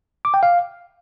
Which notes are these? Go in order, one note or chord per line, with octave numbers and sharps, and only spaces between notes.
D6
G5
F5